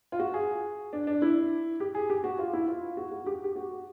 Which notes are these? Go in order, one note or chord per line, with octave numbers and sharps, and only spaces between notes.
F4
F#4
G#4
D4
D4
E4
G4
G#4
G4
F#4
F4
E4
F4
F#4
F#4
G4
G4
F#4